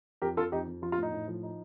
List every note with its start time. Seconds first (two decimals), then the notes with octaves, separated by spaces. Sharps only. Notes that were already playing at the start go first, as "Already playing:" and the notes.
0.22 F2 G4 A#4
0.37 F2 F4 A4
0.52 F2 D#4 G4
0.67 F2
0.82 F3 F4
0.92 F4
0.98 A2 D#4
1.12 A2
1.28 F3
1.43 D#4